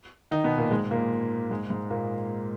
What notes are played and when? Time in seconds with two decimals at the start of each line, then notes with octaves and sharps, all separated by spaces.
0.31 D#3 D#4
0.44 B2 B3
0.58 A#2 A#3
0.71 G#2 G#3
0.91 A#2 A#3
1.51 G#2 G#3
1.70 G#2 G#3
1.90 A#2 A#3